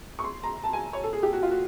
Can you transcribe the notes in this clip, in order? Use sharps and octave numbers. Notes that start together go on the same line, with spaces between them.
C#6
C6
A#5
A5
G#5
C#5
A4
G#4
G4
F#4
F4
F#4